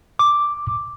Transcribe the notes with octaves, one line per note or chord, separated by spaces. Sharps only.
D6